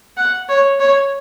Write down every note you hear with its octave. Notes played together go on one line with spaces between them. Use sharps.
F#5
C#5
C#5